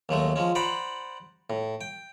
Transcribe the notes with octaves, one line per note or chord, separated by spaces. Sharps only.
D#2 F#3 G#3 A3
F3 G#3 C#4
C5 D5 F#5 A#5 B5
A2
G5